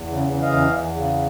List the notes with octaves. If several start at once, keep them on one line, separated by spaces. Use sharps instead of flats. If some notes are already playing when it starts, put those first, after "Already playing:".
Already playing: E2
C#3
E3
D#5 F5
E2
E2
C#3